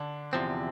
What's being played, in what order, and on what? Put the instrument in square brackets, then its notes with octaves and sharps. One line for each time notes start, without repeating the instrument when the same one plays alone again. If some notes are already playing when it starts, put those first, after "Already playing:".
Already playing: [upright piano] D3 D4
[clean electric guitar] E2 C3 F3 C4